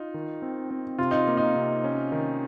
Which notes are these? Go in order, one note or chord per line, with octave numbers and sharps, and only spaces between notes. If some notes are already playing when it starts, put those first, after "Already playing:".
Already playing: D#4 F4
D#3
C4
C4
C3 F4
D#4
A#3
D#4
C3
C#4
D#3